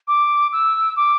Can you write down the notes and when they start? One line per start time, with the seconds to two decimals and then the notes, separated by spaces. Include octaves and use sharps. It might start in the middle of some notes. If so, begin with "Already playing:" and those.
0.08 D6
0.53 E6
0.96 D6